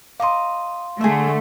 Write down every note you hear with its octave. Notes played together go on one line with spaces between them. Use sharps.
D#5 F5 A#5 C6 D6
D3 A3 G#4 E5